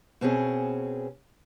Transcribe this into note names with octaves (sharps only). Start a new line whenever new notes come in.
B2 C4 C#4 G#4